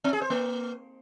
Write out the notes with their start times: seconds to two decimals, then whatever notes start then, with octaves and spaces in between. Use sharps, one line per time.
0.04 C4
0.13 G#4
0.22 C5
0.30 A#3